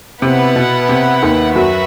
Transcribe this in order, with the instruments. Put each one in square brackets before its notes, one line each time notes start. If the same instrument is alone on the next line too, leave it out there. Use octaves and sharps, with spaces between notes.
[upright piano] C3 [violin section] B3 E4 B4 F#5
[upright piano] B2
C3
D#2 D#3
[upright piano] F#2 F#3 [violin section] F#4 B4 E5